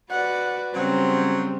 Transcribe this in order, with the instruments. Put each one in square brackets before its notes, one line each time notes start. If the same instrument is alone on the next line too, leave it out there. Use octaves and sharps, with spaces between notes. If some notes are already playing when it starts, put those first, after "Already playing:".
[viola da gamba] F#4 B4 D5 [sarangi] F#5
[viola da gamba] C#3 G3 [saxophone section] F#3 [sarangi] C4